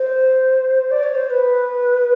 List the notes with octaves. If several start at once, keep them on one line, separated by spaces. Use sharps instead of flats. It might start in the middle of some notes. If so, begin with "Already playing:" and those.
Already playing: C5
D5
C#5
C5
C5
B4